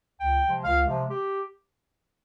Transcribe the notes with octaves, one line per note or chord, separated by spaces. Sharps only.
C#2 G5
C3 F3 G#3
C#2 F5
C3 F3 G#3
G4